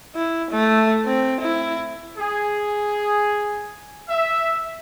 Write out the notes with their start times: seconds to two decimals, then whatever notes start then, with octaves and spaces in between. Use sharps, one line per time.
0.15 E4
0.51 A3
1.06 C4
1.41 E4
2.17 G#4
4.08 E5